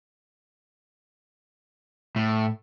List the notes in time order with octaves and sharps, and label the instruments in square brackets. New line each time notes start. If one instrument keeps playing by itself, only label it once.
[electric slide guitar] A2